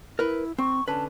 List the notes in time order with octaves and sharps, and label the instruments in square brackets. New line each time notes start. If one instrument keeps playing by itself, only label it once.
[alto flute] E4 [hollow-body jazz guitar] A#4 B4
[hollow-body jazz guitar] C4 [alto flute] C#6
[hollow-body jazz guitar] D3 C#4 B4 [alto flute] A5